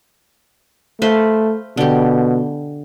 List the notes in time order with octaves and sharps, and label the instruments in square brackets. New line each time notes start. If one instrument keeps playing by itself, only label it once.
[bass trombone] A3 [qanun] B4 C5 F5
[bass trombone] B2 [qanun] D3 G4